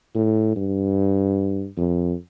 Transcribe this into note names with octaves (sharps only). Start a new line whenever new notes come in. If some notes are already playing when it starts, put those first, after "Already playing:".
A2
G2
F2